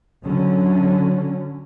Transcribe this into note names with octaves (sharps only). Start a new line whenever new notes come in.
D3 F#3 C#4